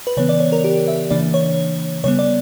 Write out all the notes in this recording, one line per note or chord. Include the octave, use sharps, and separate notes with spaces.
B4
C#3 E3 B3 C#5
D5
C#5
A#4
G4
E5
C#3 E3 A#3 D4 D5
C#5
C#3 G3 B3 C#5
D5